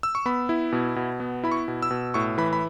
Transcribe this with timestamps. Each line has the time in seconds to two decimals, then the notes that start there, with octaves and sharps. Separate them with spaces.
0.03 E6
0.15 C#6
0.26 B3 B5
0.49 E4
0.72 B2
0.96 B2
1.20 B3
1.44 E4 B5
1.52 C#6
1.68 B2
1.82 E6
1.91 B2
2.14 A2 C#6
2.38 E3 B5
2.53 B5